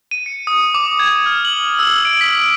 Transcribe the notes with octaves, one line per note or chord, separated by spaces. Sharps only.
D#7
C#7
D#6
D6
G#6
F6
F#7
E6
D7
B6